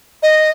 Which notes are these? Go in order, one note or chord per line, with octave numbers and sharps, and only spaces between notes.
D#5